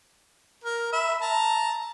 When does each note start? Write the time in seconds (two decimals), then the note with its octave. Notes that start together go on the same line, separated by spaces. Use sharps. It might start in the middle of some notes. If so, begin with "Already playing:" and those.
0.64 A#4
0.93 E5 B5
1.21 A5 A#5